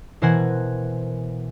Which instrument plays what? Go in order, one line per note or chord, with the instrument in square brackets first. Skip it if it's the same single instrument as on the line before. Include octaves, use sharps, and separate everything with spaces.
[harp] B2 E3 A#4 C5 F#5 G#5